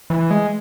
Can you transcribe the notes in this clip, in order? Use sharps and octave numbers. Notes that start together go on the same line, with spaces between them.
E3
G#3